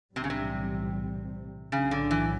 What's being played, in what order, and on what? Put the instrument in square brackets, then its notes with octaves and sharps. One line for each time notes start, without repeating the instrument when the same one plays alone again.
[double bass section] B1 A2 E3 G3 C4 [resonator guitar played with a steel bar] C3
[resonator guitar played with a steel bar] C#3
C3
[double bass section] B1 A2 F#3 [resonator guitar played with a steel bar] C#3
[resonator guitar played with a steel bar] D3
E3